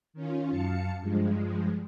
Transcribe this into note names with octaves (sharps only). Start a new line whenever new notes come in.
D#3 C#4 F4
F#2 F5 A5 C#7
G2 F3 G#3